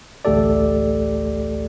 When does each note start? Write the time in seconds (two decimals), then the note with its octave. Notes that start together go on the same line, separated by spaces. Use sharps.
0.25 A1 D2 A3 G4 A4 D5